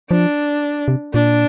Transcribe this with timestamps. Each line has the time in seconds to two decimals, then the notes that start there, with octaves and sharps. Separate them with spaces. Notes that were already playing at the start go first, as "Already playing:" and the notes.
0.10 F3 D4
0.88 C3
1.14 A#2 D4